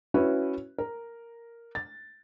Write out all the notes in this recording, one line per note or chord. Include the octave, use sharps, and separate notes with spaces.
C#4 E4 F#4 B4
A#4
A6